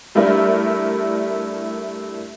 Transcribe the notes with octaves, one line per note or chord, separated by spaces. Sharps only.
G3 A3 D4 E4 A#4